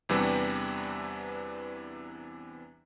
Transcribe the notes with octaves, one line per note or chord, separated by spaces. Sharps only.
E2 C3 E3 G3 B3 D4